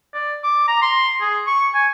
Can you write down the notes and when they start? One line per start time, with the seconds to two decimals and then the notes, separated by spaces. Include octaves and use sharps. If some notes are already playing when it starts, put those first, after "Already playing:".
0.14 D5
0.44 D6
0.68 A#5
0.82 C6
1.21 G#4
1.47 C#6
1.74 G#5